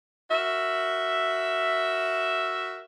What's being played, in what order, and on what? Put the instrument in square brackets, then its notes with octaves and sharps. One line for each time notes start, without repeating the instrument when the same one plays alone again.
[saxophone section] F#4 A#4 E5